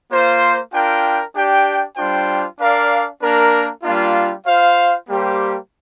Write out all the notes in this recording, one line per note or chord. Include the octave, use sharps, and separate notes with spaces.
A#3 F4 C5
D4 F4 A#4 G5
D4 G4 D5 G5
G3 D4 F4 C5 G5
D4 A#4 D5 F5
A#3 D4 A#4
G3 A#3 D4 F4
F4 C5 F5
G3 A#3 G4 C5